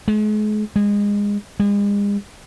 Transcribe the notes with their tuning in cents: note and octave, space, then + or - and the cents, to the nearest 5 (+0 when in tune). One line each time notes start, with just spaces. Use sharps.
G#3 +40
G#3 -25
G#3 -40